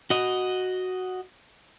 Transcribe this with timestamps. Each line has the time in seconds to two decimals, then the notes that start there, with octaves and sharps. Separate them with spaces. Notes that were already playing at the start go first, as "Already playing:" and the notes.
0.10 F#4 D#5